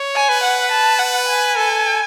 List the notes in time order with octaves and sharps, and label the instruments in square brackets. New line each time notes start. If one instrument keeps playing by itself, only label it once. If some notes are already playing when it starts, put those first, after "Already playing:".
Already playing: [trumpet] C#5
[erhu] G#5
[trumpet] B4
[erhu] F#5
A5
F#5
G#5
[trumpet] A4